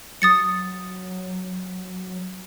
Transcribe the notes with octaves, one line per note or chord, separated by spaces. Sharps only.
F#3 D#6 A6 C#7